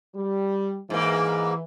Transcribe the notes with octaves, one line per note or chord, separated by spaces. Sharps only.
G3
G#2 E3 A#3